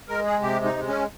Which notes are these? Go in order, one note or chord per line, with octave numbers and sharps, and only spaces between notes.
G#3 A#4
G#4
C3 G4
D#4
G#3
C#4